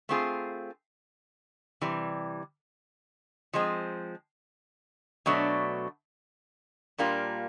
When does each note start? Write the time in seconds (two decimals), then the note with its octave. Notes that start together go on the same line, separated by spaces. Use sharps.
0.09 A3 C4 F4 G#4
1.81 C3 E3 G3
3.53 F3 G#3 C4
5.26 B2 F#3 A3 D4
6.98 A#2 G3 A#3 D4 F4